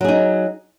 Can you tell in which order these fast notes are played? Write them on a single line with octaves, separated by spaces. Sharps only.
F#3 G#4 D#4